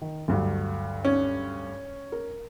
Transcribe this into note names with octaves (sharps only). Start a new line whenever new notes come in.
D#3
D2 G2 F#3
C#4
A#4